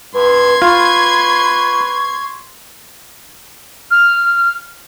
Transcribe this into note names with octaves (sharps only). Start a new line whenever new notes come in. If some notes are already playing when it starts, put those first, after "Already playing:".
G2 B4 C6 G#6
F4 B4 C#6
F6